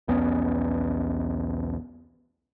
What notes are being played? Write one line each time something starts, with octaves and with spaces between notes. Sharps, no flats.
B1 E2 B3 C#4